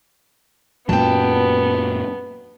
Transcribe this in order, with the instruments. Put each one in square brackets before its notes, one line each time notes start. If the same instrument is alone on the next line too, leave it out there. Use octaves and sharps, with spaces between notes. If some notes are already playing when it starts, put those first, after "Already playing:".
[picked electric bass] F#2 A#2 F#3 [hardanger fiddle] B3 [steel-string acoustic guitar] G5 A5